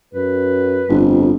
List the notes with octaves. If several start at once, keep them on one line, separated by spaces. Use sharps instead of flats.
F#2 B4
G1 F2